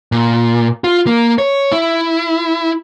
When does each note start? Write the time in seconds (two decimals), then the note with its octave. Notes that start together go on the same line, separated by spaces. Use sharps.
0.12 A#2
0.84 F4
1.07 A#3
1.38 C#5
1.73 E4